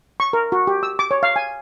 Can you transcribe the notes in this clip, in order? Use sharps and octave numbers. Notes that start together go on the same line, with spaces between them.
C#6
A#4
F#4
G4
E6
D6
C#5
F5
G#5